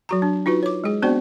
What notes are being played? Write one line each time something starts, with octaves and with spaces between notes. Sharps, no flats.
F#3 F#4 A#5
D4
D#4 F4 F#4 B4
C#5 D6
G#3 G#4
B3 C4 D4 F#4 C5 D5